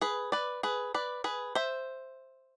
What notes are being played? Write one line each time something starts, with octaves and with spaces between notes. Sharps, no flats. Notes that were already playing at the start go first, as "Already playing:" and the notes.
G#4 B4
B4 D5
G#4 B4
B4 D5
G#4 B4
C5 E5